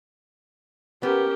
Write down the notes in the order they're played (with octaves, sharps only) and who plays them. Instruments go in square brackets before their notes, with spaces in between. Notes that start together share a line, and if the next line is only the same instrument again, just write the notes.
[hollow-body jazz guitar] B3 [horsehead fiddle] C#4 A#4 [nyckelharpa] G4